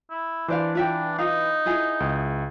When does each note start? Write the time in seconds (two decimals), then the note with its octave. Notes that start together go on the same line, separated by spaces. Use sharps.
0.10 E4
0.48 E3 D4 C5 D5 F5
0.75 F4 E5 G5
1.18 D#4 F4 F5
1.66 E4 F4 G#4
2.00 C#2